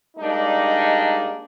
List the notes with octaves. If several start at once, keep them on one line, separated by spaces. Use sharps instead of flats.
G3 G#3 A#3 D4 D#4